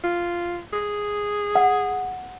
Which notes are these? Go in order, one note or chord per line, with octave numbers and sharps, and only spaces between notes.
F4
G#4
F#5